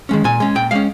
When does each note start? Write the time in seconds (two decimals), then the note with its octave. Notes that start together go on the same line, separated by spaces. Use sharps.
0.09 D#3 G#3 C#4
0.24 A#2 G#5
0.40 G#3 C#4
0.55 A#2 G5
0.71 G#3 C#4 F5